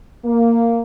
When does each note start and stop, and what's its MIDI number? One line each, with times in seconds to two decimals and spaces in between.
0.25 0.82 58